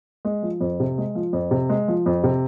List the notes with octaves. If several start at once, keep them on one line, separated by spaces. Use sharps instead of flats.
G#3
F3
F2
C3
G#3
F3
F2
C3
G#3
F3
F2
C3